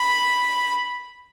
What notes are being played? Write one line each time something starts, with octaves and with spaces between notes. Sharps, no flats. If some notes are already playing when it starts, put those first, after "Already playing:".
Already playing: B5